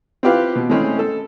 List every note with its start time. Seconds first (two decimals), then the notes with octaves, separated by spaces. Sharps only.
0.23 C4 E4 F4 G4 B4 F5
0.55 B2
0.69 G#3 A3 C4 C#4 E4 G#4
0.99 A4